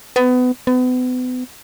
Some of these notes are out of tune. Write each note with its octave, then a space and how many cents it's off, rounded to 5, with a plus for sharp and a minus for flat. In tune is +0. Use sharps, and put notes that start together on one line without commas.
B3 +25
B3 +35